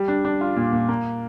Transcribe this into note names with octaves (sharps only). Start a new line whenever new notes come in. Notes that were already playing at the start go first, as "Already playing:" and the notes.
Already playing: G3
D4
D4
F4
A#2
A#2
A#3